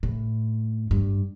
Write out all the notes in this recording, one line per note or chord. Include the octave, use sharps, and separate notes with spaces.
A2
G2